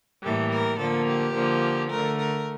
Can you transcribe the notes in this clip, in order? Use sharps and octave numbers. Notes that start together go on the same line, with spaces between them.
A2 E3 G3 A#3 A4
A#4
D3 F3 A#3 A4
G4
D3 F3 A#3
D3 A3 A#4
A#4